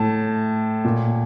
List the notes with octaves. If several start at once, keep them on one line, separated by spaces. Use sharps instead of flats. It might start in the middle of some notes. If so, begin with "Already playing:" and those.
Already playing: A2 A5
A#2